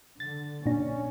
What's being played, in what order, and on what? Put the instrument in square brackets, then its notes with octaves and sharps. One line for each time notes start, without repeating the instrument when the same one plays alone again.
[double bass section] D3 [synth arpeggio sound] A6
[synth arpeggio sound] A#2 D4 [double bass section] C#4